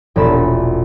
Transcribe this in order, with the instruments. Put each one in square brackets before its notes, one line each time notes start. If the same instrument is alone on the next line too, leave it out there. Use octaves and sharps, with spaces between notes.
[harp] E1 A#1 D5 B5 E7